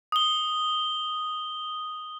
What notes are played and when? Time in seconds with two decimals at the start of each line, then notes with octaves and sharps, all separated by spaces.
0.12 D#6 G7